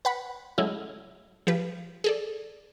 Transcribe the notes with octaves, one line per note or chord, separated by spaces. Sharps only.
B4 F#5 B5
F#3 G#3 A3 C#4 E4
F3 F4 G4 B4
G#4 A4 D5